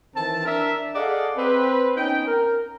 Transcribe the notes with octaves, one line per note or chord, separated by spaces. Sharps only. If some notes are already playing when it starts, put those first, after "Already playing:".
D#3 E3 C4 A5
D4 A#4 E5
G#4 A4 D5 D#5 F5 F#5
C4 B4
B3 C#4 D#4 G5
A#4